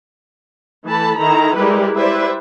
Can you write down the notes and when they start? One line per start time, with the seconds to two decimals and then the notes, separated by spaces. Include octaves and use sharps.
0.86 E3 A3 A4 A5 B5
1.18 D#3 E4 A4 A#5
1.57 G3 G#3 E4 G4 A#4 B4
1.95 E4 G4 B4 C5 D5 E5